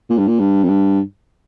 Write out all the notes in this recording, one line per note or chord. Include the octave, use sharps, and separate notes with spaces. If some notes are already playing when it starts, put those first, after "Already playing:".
A#2
G2
A#2
G2
F2
G2